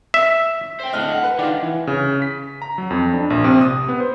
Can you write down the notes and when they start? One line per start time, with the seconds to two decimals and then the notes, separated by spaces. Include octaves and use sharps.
0.14 E5
0.80 C5 G5
0.93 A2 D3 D#5 F6 F#6
1.11 F#5
1.24 B4
1.39 D#3 D4 F4
1.62 E3
1.87 C#3
2.22 B6
2.62 A#5
2.78 F#3
2.90 F2
3.14 D4
3.30 A#1
3.44 C3
3.61 D#6
3.89 B3
4.00 C5